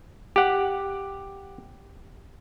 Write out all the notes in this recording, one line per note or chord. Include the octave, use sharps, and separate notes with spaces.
G4 F#5